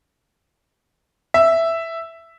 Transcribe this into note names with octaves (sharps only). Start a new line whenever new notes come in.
E5